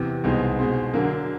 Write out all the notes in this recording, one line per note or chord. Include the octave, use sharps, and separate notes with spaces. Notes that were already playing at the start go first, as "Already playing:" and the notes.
Already playing: E2 C3 E3
C2 B2 G#3 C4 D#4
B2 G#3 C4
D3 F#3 A#3